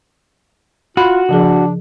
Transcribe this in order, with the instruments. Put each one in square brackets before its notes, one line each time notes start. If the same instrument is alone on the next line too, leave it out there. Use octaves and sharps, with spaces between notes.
[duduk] F4 [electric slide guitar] F#4 [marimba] B5 F#6
[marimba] C#3 F3 G#4 [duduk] D4